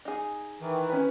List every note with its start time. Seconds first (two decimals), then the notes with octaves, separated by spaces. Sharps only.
0.05 D#4 G#4
0.61 D#3 E3
0.90 C#4 B4